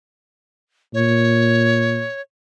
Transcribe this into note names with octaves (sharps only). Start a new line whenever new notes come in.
A#2 C#5